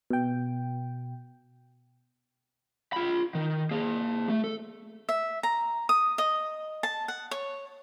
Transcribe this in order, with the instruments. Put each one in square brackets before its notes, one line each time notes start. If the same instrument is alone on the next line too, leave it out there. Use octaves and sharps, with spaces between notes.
[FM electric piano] B2 G5
[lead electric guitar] F4 B5
D#3
A#3 G#4
A3
A4
[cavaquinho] E5
A#5
D#6
D#5
A5
F#5
C#5